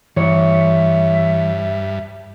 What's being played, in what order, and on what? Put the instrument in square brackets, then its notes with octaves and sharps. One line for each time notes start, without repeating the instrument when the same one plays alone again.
[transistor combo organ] G2 [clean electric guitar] E3 C#5 [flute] E5